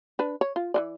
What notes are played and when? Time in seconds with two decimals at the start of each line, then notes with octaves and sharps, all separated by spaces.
0.19 D4 B4
0.41 C#5
0.56 F4
0.74 E3 A#3 D5